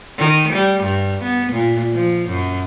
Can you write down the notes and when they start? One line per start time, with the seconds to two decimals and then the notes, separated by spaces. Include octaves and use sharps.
0.18 D#3
0.53 G3
0.83 G2
1.23 B3
1.53 A#2
1.92 F3
2.29 F#2